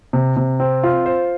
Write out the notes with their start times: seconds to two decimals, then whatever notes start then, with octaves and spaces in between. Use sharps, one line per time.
0.13 C3
0.37 C3
0.60 C4
0.83 F4
1.06 C5